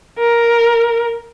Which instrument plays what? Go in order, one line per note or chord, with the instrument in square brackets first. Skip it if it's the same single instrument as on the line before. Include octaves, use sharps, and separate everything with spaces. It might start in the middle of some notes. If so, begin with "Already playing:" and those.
[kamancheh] A#4